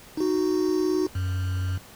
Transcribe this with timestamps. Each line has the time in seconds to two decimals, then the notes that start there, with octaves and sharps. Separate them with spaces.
0.17 D#4 F#4
1.15 F#2